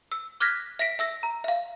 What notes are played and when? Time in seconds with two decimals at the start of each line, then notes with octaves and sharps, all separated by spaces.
0.12 E6
0.40 D6 F6 F#6 G#6 A#6 B6
0.79 E5 A#6 B6 D7
0.99 E5 E6 A#6
1.23 A#5
1.44 E5 F5